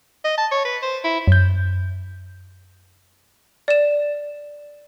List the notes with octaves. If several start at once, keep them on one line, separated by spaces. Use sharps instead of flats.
D#5
A5
C#5
B4
C5
E4
F#2 G6
D5 E7